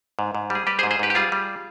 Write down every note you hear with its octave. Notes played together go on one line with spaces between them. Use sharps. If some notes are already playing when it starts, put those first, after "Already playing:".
G#2
G#2
G3
G#4
G3 G4 B4
G#4 C5
G#2
G#4 C5
G#2 G4 B4
G4
G3 F4 G#4
G3